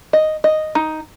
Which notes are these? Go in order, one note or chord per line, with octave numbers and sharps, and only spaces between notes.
D#5
D#5
D#4